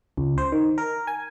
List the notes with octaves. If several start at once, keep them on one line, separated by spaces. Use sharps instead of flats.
C#2
C5
D#3
A#4
G#5